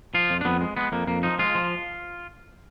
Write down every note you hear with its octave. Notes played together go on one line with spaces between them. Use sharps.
F3 F4
F2
D4
F2 B3
G#3
G#3 B3
F2 A#3
F2 A#3
F3 D#4
G#3 F4
F3